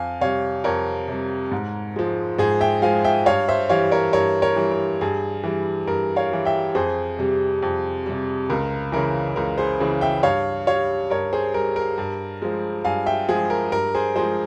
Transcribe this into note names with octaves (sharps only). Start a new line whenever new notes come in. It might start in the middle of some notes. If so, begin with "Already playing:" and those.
Already playing: F2 F5 G#5
C3 G3 C#5 F5
F2 A#4 C#5
C3 G3
G#2
F3 G#3
G#2 G#4 C5
E5 G5
F3 G#3 F5 G#5
E5 G5
G2 C#5 F5
C5 E5
E3 G3 C#5 F5
A#4 C#5
G2 A#4 C#5
A#4 C#5
E3 G3
A#4
G2 G#4
E3 G3
G2 A#4
C#5 F5
E3 G3
E5 G5
F2 G#4 C5
C3 G3
F2
C3 G3
C#2 A#4
C#3 E3 A#4
C#2 A#4
G#4 C5
C#3 E3
E5 G5
G2 C#5 F5
G3 C#5 F5
G2 A#4 C#5
G#4 C5
G3 A#4
A#4
G2
F3 G#3
G2 F5 G#5
E5 G5
F3 G#3 G#4
A#4
G2 A#4
G#4 C5
F3 G#3 G#4 C5